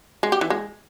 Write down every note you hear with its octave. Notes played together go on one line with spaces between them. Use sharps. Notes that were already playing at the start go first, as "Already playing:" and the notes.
G#3
G4
E3
G#3